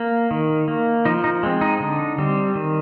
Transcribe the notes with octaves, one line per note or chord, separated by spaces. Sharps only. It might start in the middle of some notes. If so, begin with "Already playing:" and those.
Already playing: A#3
D#3
A#3
F3 D#4
D#4
G#3 C4
D#4
D3
G3 C4
D#3